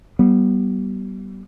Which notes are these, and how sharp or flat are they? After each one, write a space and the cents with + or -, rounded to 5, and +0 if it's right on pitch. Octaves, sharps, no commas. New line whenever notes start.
G3 -30 B3 -20